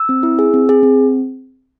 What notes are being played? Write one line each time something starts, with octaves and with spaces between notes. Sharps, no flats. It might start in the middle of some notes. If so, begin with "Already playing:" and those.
Already playing: E6
C4
E4
G#4
C4
G#4
C4